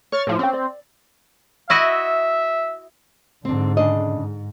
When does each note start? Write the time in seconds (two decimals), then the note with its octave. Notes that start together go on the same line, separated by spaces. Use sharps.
0.12 C#5 C#6 F6 A6
0.27 A2 F3
0.39 C4 C#4 G5
0.53 D5
1.70 E4 F#4 D#5 E5
3.45 G#2 D3 C4 D4
3.77 C#3 D4 D#5
4.13 G#2